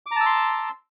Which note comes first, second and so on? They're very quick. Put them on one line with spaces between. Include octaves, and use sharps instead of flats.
D6 A#5 A5 E6 C6